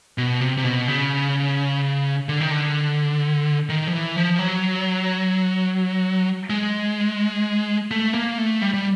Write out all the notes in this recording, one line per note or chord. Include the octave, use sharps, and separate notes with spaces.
B2
C3
C3
B2
C#3
D3
D#3
D3
D#3
F3
E3
F3
F#3
G#3
A3
A#3
A3
G3
G3